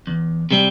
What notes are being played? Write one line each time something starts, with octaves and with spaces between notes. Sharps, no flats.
E2
C3 G3 C4